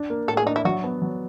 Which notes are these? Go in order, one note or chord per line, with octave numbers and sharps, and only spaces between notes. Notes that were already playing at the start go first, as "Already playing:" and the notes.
Already playing: D4
A#3
A2 A4
G#4
D4 D#4
E4
F#3 F#4
B3
F#3